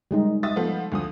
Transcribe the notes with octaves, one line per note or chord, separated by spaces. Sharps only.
G3 G#3 D#4
E5 D#6 A6
F3 A3 B3
D2 F3 D#6